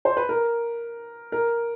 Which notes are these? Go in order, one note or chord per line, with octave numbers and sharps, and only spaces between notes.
C5
B4
A#4
A#4